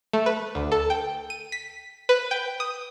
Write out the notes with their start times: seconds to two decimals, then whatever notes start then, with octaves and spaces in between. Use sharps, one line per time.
0.13 A3
0.26 B4
0.55 D2
0.72 A4
0.90 G5
1.30 D#7
1.52 B6
2.09 B4
2.31 G5
2.60 D#6